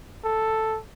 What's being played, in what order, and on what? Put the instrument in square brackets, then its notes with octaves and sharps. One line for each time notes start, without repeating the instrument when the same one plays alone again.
[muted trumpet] A4